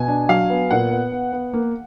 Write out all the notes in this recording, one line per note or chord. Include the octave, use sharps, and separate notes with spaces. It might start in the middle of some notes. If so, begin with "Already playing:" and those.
Already playing: B2 G#5
D4
F#3 F5
B3
A#2 F#5
B3
B3
B3
A#3